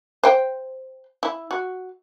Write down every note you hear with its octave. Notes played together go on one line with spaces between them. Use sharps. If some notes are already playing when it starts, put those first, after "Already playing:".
C5 G5
E4
F#4